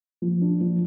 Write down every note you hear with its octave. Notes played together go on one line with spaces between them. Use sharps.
F3
D4
F3